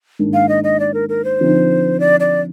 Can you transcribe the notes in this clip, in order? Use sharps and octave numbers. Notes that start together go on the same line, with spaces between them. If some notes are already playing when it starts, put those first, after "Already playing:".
G#2 D#3 A#3 D4
F5
D#5
D#5
D5
A#4
A#4
C5
D3 F3 C4 D#4
D5
D5